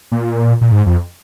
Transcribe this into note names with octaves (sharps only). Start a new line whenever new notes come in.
A#2
A#2
G#2
F2